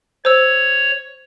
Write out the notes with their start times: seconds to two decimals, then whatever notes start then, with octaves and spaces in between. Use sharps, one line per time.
0.25 C5 C#5 E6